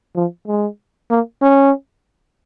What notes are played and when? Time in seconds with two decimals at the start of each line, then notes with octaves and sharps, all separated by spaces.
0.16 F3
0.47 G#3
1.10 A#3
1.42 C#4